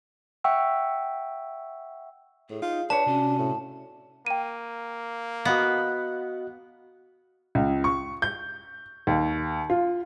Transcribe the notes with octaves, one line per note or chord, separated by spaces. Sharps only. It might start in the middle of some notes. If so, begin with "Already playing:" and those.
E5 F#5 G5 C#6 E6
A2 G#4
D#4 F4
D4 B4 C#5 A5
C3 C#4 F#4
A2
A#3 G5 D#7
B3 F#4 D#5 F5
C#2
C#6
G6
D#2
F4